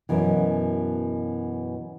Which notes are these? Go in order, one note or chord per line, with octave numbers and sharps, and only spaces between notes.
F#2 B2 E3